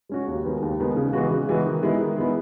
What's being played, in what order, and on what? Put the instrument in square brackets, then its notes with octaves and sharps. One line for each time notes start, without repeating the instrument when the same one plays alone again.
[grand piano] G#3 C#4 F#4
D#2
D#3 G#3 B3
D#2
D#3 G#3 B3
C#3
E3 G#3 B3 F#4
C#3
E3 G#3 B3 F#4
D#3
G#3 B3 E4
D#3
G#3 B3 E4